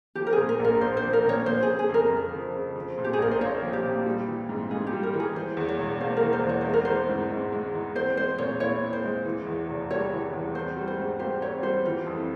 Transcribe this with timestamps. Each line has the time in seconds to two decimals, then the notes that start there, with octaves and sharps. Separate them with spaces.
0.15 F3 G4
0.27 A#4
0.33 A#2 G#4
0.49 A#4
0.59 A#1
0.65 A#4
0.81 A#1 C5
0.97 C5
1.03 F3
1.13 A#4
1.25 A#2 C#5
1.46 F3 C5
1.63 G#4
1.68 C#3
1.79 G#4
1.89 F2
1.94 A#4
2.11 F2
2.33 F3
2.54 C#3
2.76 F3
2.98 A#2
3.04 G4
3.13 G#4
3.19 A#1 A#4
3.31 C5
3.41 A#3 C#5
3.62 F3
3.73 G4
3.84 A#2
4.06 G3
4.28 E3
4.49 G#2
4.71 G#2 G#4
4.87 G4
4.92 G3
5.03 A#4
5.14 E3
5.20 G#4
5.36 E3 C5
5.57 E2
5.69 C#5
5.79 E1
6.00 A#3 C5
6.17 A#4
6.22 E3
6.33 C5
6.43 E2
6.49 C#5
6.61 G#3 C5
6.73 A#4
6.85 E3 C5
7.09 G#2
7.31 G#2
7.52 G#3
7.74 E3
7.95 C4 C5
8.17 G#3 C5
8.38 A#2 C#5
8.60 E4 C#5
8.82 C4
8.93 C5
9.04 G#3
9.25 E3
9.47 E2
9.68 F1
9.90 G3 C#5
10.12 E3
10.33 E2
10.55 C4 C5
10.77 G3
10.88 C5
10.98 G#2
11.19 G4 C5
11.42 C4 C#5
11.63 G3 C5
11.85 E3 F4
12.06 F2
12.17 E4